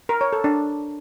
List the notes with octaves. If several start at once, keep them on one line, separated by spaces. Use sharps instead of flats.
A#4
C#5
A4
D4